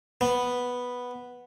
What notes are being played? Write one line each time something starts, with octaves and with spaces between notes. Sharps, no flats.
B3